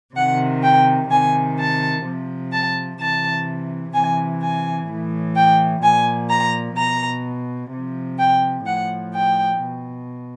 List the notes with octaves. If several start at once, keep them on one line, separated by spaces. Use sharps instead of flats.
C3 D#3 F#5
G5
C3 D#3 G#5
A5
C3 F3
A5
C3 E3 A5
C3 E3 G#5
G#5
A2 E3
G5
A#2 F3 G#5
A#5
B2 A#5
C3 F3
G5
A2 F3 F#5
G5
B2